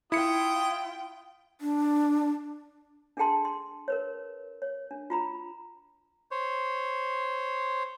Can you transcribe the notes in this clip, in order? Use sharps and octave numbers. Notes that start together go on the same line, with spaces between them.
E4 F4 G5 D#6 C#7
D4
D4 G#4 A4 G5 A5 C6
C6
A#4 B4 C#5
C#5
D4
F4 A#5 B5
C5 C#5